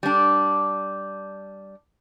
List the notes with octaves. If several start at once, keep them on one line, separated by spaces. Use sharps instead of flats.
G3 D4